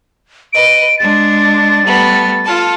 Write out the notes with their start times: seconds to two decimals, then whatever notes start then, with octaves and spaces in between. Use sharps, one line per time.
0.53 B4 D#5 D7
0.99 G#3 D4 A6
1.84 G3 A3 B3
2.45 F4 A4 A5